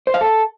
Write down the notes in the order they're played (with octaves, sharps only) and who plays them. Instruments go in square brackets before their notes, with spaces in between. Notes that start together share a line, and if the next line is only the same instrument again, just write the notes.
[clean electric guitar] C5
F5
A4